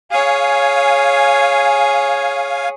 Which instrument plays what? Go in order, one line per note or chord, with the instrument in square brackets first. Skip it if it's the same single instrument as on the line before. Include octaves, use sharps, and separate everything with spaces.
[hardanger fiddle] G#4 C#5 [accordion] F5 G#5